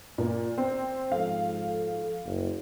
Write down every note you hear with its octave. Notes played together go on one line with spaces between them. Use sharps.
A#2 A#3
C4
G#2 F3 A4 F5
F#1